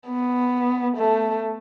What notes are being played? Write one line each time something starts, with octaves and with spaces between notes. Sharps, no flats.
B3
A3